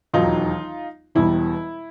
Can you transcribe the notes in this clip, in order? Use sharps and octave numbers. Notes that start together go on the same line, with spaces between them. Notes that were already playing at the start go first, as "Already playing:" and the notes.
E1 D#2 D#3 F#3 D#4 F4
E1 E2 B2 G3 E4